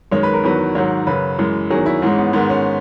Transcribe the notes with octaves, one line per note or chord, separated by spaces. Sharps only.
F#2 D#3 G#3 C#5
B4
A#4
E2 D#3 F#3 B4
G#2 D#3 F#3 C#5
F#2 C#3 F#3 B4
F#2 E3 G#3
E2 D#3 F#3 G#4
E4
G#2 E3 G#3 C#4
B3
G#2 D#3 G#3 B3
C#4